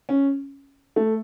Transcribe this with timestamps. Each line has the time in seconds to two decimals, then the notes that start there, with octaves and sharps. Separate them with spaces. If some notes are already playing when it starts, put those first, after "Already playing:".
0.09 C#4
0.96 A3